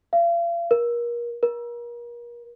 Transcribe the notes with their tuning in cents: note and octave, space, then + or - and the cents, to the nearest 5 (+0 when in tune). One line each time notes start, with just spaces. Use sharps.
F5 -40
A#4 +30
A#4 +35